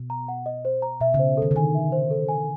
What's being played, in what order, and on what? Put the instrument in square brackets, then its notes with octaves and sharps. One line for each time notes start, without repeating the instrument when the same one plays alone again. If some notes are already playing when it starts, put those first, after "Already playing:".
Already playing: [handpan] B2
[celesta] A#5
F#5
D#5
C5
A#5
[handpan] B2 [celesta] E5
[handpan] C#3
[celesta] C5
[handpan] D#3 [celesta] A4
[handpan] D3
[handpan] D#3 [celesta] G#5
[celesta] E5
C5
A4
G#5